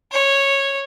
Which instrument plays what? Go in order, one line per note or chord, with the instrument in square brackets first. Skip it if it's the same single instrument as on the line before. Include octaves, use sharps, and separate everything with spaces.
[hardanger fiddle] C#5